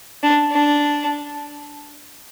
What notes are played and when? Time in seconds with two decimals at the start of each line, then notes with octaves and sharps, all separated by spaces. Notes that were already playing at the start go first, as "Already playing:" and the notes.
0.23 D4
0.52 D4